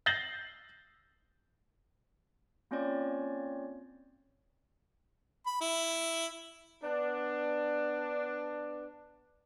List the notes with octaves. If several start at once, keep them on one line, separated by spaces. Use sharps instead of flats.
G6 A6 A#6 C7 F#7 G7
A#3 C4 C#4 F4 C#5 D5
B5
E4
B3 D4